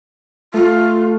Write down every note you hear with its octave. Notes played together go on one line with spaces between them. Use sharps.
A3 F4